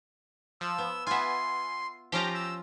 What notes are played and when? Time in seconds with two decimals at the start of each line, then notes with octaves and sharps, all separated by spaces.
0.61 F3 E6
0.78 B3
1.07 B3 F4 E5 G#5 C6
2.12 F3 C#4 F4 G4 A#5
2.34 E6